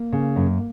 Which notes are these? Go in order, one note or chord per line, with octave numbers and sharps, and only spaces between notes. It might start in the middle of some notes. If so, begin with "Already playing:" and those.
Already playing: A#3
C#3
F#2